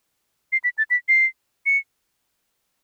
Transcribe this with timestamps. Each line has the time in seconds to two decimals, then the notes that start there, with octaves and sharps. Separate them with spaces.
0.52 C7
0.64 B6
0.78 A6
0.91 B6
1.09 C7
1.66 C#7